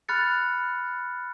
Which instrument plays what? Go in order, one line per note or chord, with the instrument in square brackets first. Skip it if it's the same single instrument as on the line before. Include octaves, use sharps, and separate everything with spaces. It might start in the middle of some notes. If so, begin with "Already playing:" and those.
[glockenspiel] B5 F6 F#6 A6 C#7